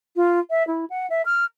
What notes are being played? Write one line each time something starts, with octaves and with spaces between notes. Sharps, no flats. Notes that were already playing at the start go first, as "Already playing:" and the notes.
F4
E5
E4
F#5
E5
F6